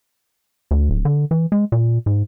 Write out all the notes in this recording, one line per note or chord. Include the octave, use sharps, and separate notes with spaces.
D2
D1
D3
E3
G#3
A#2
G#2